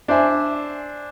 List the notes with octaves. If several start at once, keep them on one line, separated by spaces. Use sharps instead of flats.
D4 C5 E5 G#5